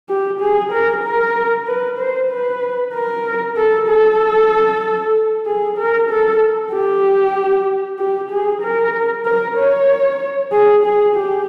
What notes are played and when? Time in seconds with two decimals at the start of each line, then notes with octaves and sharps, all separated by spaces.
0.09 G4
0.41 G#4
0.72 A#4
1.04 A#4
1.67 B4
1.98 C5
2.30 B4
2.94 A#4
3.57 A4
3.88 A4
5.46 G#4
5.78 A#4
6.10 A4
6.73 G4
7.99 G4
8.31 G#4
8.62 A#4
9.26 A#4
9.57 C#5
10.52 G#4
10.84 G#4
11.15 G4